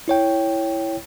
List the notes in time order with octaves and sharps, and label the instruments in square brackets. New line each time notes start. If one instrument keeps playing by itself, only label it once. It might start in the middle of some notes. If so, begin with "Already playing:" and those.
[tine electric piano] E4 C#5 G5